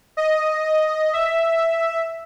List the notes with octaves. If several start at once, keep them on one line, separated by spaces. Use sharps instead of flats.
D#5
E5